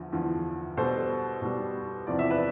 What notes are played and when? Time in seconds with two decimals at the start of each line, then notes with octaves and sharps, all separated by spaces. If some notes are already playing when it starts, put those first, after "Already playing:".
Already playing: E2 D3 F3
0.13 E2 D3 F3
0.77 B2 G3 A4 C5
1.42 B2 G3
2.07 E2 C3 F3 D5
2.19 E5
2.31 B4 D5